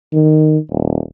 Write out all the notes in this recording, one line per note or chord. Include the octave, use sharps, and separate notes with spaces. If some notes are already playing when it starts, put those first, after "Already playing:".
D#3
D#1